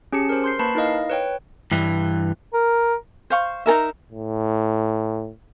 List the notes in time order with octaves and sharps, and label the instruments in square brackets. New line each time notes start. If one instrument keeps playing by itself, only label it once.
[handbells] C#4 G4 G#4 A5 C#7
A#4 C5
C6 G6 C7
A#3 B4 A5 B5 C#6 C7
D#4 E4 A#4 D#5 F5
B4 C#5 G5
[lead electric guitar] G2 E3
[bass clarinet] A#4
[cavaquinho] C5 F5 C#6
D#4 A4 A#4 E5
[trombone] A2